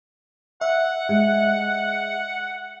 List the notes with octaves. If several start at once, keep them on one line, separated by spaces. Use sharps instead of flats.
E5 F#5
G#3